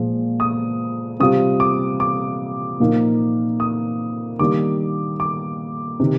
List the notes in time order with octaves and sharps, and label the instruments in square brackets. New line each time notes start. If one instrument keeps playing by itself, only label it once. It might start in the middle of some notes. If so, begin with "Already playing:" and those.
Already playing: [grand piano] A#2 F3 G#3
D#6
C3 G3 C4 F4 D#6
D6
D6
A#2 F3 A#3 D#4
D#6
D#3 G3 A#3 D4 D6
D6
C3 D#3